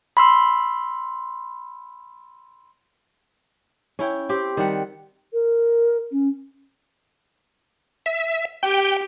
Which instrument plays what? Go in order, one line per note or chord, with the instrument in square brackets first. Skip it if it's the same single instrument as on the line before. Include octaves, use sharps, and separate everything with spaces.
[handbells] B5 C6 E6
[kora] C#4 E4 G5
C4 G4
D#3 G3 F#5
[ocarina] A#4
C#4
[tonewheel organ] E5
[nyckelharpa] G4 [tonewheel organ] G5